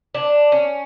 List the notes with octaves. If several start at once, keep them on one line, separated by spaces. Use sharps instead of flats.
D4
C#4